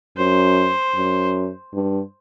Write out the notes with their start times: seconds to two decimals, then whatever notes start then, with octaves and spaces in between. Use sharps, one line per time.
0.17 F#2 C5
0.95 F#2
1.74 G2